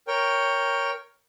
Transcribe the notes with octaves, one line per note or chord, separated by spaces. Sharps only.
A#4 C#5 G5